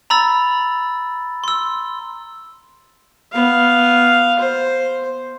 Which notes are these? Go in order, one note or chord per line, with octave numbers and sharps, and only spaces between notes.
A#5 B5 E6 A6
C6 E6
B3 F5
C5